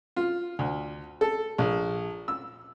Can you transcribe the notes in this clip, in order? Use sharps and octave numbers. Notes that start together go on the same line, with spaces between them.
F4
D2
A4
A#1
E6